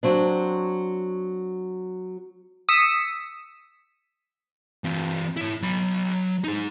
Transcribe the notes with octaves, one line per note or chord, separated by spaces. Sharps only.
F#3 C4 D4
D#6 E6 B6 C#7
E3 C4
E4 C#5
F#3 B5
D#4 G#4